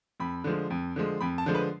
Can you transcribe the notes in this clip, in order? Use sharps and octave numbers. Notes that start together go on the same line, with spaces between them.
F2 B5
D3 F3 G#3
F2
D3 F3 G#3
F2 B5
A5
D3 F3 G#3
B4